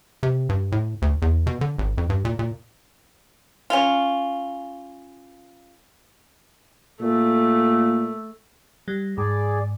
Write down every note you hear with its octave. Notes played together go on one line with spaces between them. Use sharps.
C3
G2
A2
D2
E2
B2
D3
G#1
F2
G2
A#2
A#2
C#4 F4
A#2 A3
G3
G#2 G#4 D5